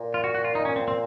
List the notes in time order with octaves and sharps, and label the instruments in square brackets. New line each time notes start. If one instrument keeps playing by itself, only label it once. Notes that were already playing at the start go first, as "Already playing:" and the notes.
Already playing: [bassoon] A#2
[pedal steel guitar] F4
F#4
F#4
F4
D#4
C#4
C4
C4